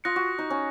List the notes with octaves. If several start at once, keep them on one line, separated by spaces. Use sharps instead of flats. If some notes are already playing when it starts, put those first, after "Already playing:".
F4 D#6 F#6 A#6 C#7
F#4
D#4
C#4